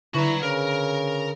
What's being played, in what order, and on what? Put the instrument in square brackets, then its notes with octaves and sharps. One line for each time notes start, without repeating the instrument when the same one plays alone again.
[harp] D3 D4 B4 [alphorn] E4 [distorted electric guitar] F#4 A#5
[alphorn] C#3 [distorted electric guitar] A#4